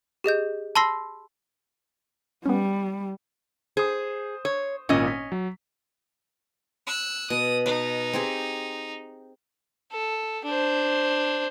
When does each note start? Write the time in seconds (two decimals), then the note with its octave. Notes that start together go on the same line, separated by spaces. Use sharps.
0.24 G4 G#4 D#5 G6
0.76 A5 B5 C6 E6 A#6 C7
2.46 G3 B3 C#4
3.77 G#4 C5 D#6
4.45 C#5
4.89 G#1 A#2 C#4 D#5
5.07 B6
5.32 F#3
6.87 E6 F#6
7.30 B2 D#6
7.66 D#4 B4
8.13 C4 G4 G#4
9.92 A4
10.45 D4 C5